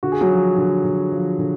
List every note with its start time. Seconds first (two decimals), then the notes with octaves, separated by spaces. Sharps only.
0.03 D3 F#4
0.12 G#4
0.21 F#3 F#4
0.30 F3
0.58 D3
0.84 D3
1.12 F3
1.39 D3